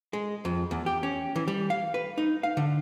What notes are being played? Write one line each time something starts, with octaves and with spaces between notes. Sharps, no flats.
G#3
F2
E2
G4
C#4
E3
G3
F5
B4
D#4
F5
D3